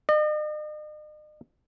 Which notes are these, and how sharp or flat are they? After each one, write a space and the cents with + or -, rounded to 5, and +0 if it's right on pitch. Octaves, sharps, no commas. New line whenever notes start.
D#5 -45